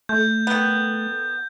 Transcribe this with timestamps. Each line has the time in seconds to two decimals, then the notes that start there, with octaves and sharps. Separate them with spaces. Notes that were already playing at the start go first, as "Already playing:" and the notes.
0.09 A3 G6
0.47 D#3 B3 A4